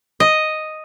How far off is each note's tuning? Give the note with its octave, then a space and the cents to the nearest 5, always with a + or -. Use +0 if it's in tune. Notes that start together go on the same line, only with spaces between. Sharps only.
D#5 +0